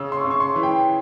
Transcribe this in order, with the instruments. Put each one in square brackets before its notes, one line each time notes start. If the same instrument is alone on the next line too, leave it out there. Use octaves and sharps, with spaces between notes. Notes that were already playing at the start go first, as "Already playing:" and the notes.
Already playing: [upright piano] C#3 [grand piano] E6
[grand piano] C6
C#6
[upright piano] C#3
[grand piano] C#6
C6
[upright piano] E3
[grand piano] G5